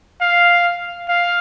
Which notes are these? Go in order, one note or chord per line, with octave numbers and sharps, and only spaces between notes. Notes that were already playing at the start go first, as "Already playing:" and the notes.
F5
F5